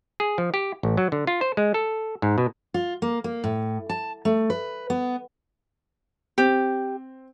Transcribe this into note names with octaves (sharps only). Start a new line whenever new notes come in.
G#4
F3
G4
A1
F#3
D3
F4
C5
G#3
A4
G#2
B2
F4
A#3
A#3
A2
A5
A3
B4
B3
C4 G4